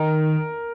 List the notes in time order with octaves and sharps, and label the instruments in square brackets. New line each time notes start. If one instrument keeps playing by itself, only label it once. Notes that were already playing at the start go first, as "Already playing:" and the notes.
Already playing: [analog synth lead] D#3 [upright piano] A#4